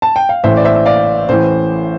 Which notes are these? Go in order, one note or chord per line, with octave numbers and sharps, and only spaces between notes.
A5
G5
F5
A1 A2 E3 C5 E5
D5
C5 E5
E5
D5 F5
A1 A2 E3 C5